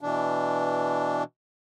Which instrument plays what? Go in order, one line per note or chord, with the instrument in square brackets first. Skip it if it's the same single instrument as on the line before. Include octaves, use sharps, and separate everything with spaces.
[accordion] B2 E3 D4